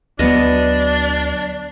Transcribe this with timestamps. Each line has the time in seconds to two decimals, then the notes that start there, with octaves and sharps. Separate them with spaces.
0.19 D2 F#3 B3 D4 D#5